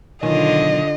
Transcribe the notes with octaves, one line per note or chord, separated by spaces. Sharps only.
B1 D3 D#3 F4 D#5 G#5